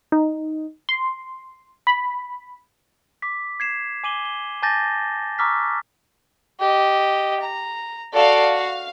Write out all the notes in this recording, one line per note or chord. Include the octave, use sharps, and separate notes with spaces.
D#4
C6
B5
D6 B6
G#6 C7 E7
G#5 D6 D#7 F#7 G7
G7
G#5 A5 D6 G6 A6 A#6
A#5 C#6 D6 E6 F6 B6
G4 D#5
A#5
F#4 A4 D5 F5
F5